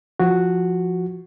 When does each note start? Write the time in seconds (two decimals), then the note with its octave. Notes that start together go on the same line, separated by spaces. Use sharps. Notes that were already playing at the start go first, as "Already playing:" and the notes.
0.20 F3 F#4